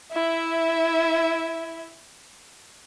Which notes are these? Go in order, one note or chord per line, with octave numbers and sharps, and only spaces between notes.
E4 E5